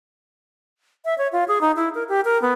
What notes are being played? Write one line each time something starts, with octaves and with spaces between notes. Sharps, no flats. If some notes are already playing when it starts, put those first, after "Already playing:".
E5
C#5
F4
G#4
D#4
E4
A#4
G4
A#4
B3